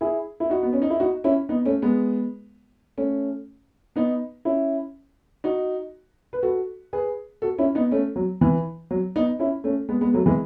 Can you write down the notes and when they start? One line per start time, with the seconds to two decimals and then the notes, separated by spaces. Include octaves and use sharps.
0.01 E4 G#4
0.40 E4
0.50 D#4 F#4
0.63 B3
0.73 C#4
0.82 D#4
0.90 E4
1.00 D#4 F#4
1.24 C#4 E4
1.49 B3 D#4
1.65 A3 C#4
1.82 G#3 B3
2.98 A3 C#4
3.96 B3 D#4
4.45 C#4 E4
5.44 D#4 F#4
6.33 B4
6.43 F#4 A4
6.93 G#4 B4
7.42 F#4 A4
7.58 C#4 E4
7.75 B3 D#4
7.91 A3 C#4
8.16 F#3
8.41 E3
8.91 F#3
9.16 B3 D#4
9.39 C#4 E4
9.64 A3 C#4
9.89 G#3 B3
10.01 G#3 B3
10.14 F#3 A3
10.26 E3 G#3